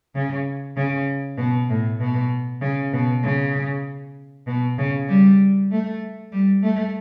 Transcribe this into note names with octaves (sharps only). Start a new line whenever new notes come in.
C#3
C#3
B2
A2
B2
C#3
B2
C#3
B2
C#3
G3
A3
G3
A3